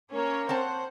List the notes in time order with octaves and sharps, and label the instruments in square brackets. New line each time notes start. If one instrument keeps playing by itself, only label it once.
[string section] A#3 C#4 C#5 [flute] A#4
[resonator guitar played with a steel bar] C4 C#5 A5 [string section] C5 F#5